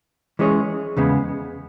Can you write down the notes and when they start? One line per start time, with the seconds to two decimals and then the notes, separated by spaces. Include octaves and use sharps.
0.39 E3 G#3 C#4 G#4 C#5
0.97 E2 C#3 G#3 B3